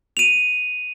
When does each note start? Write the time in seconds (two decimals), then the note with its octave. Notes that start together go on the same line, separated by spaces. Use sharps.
0.17 D#7 F7